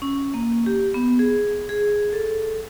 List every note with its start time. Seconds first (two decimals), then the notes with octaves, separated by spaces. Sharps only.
0.02 C#4
0.34 A#3
0.66 G4
0.94 B3
1.19 G#4
1.69 G#4
2.13 A4